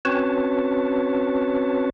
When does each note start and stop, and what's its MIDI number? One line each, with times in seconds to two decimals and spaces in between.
0.05 1.90 60
0.05 1.90 61
0.05 1.90 66
0.05 1.90 71
0.05 1.90 73
0.05 1.90 81